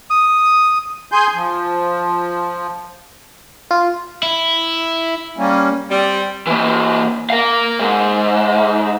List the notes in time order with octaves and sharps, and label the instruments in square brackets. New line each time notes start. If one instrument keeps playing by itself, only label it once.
[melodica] D#6
[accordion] G#4 G#5 C6 G6
F3
[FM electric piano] F4
[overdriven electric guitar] E4
[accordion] G3 A#3 C#4
[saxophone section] G3 [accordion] C4
[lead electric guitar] E3 A#3
A#4 F5
G#2